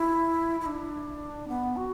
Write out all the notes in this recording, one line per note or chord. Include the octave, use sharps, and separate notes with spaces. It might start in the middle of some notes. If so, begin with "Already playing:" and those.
Already playing: E4
E4
D4
B3
F#4